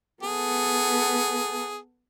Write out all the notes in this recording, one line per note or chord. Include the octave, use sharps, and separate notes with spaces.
B3 G#4 A4